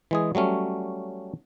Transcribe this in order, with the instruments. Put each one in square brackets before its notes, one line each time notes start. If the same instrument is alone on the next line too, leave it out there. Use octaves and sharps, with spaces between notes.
[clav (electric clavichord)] E3 G#3 G#4
F#3 G3 A3 C#4